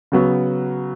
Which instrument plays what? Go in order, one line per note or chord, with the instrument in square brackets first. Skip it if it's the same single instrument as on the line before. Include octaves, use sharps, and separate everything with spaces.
[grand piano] C#3 F#3 B3 F#4